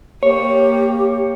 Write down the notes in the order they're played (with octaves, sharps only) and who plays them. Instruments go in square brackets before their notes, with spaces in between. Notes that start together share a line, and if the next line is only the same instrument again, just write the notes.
[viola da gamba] A#3 [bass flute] G4 [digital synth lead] C#5